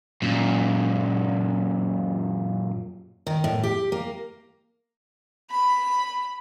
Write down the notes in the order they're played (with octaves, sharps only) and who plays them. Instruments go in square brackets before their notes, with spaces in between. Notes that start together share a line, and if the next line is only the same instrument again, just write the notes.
[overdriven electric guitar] F#2 A#2
[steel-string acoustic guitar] D#3
A2
G4
A#3
[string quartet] B5